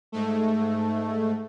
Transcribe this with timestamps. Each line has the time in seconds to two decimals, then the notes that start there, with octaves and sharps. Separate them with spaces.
0.12 G#2 A3